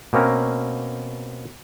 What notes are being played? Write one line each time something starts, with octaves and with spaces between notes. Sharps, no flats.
B2 A#3 C4 C#4 A#4